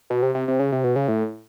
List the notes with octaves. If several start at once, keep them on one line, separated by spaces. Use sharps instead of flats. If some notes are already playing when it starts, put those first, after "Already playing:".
B2
C3
C3
C3
C#3
C3
B2
C#3
A2